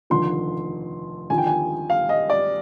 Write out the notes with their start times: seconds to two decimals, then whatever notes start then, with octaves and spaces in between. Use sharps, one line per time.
0.10 F1 D#2 D3 F3 C6
1.30 D#2 D3 F3 G#5
1.38 G5
1.47 G#5
1.90 F5
2.09 D#5
2.30 D5